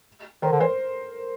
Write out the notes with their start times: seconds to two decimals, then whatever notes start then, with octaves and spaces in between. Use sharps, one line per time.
0.42 D#3 A#4 C5
0.52 D3
0.60 E3 A#4 C5